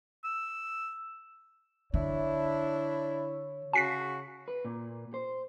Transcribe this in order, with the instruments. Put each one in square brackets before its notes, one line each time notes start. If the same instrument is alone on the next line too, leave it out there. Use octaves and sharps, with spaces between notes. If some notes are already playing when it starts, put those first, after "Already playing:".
[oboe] E6
[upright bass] D3 [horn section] D4 E4 [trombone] C#5
[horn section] C#3 F#4 [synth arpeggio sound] G#5 B6 C7
[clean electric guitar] B4
A#2
C5